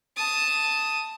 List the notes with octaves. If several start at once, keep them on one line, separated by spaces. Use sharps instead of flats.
A5 D#6